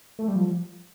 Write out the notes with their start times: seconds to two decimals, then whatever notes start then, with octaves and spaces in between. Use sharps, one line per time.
0.19 A3
0.28 G3
0.36 F3